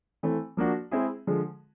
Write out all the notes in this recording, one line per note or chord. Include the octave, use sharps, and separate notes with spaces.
E3 A3 C4
F3 A#3 D4 F#4
G#3 C4 E4 G#4
D3 F3 G#3